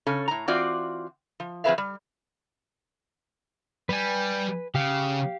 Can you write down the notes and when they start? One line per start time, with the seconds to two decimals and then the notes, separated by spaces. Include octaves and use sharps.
0.07 C#3 C#4 A4
0.28 A2 A#5
0.48 E3 C4 F4 F#4 D5
1.40 F3
1.64 F3 C4 G#4 B4 E5 F5
1.78 G3
3.89 G3 B4 G#5
4.75 C#3 G4 F5